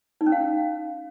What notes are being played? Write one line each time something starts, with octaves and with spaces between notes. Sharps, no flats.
D#4
C#4
F5